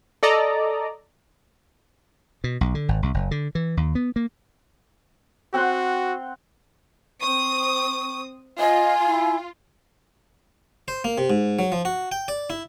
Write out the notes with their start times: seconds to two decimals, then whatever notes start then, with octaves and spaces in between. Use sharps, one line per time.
0.23 A4 D5 D#5 A#5
2.44 B2
2.61 B1
2.75 D3
2.89 G#1
3.03 C2
3.14 F#1
3.31 D3
3.55 E3
3.77 D#2
3.95 B3
4.16 A#3
5.54 C4 F#4 F#5 C6
7.22 C4 C#6 D#6
8.59 F4 D#5 G#5
9.07 E4
10.88 C5
11.04 A#3
11.18 C3
11.30 G#2
11.59 F#3
11.72 F3
11.85 F#4
12.12 G5
12.28 D5
12.50 E4